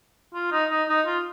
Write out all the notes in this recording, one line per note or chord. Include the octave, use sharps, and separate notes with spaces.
F4
D#4
D#4
D#4
F4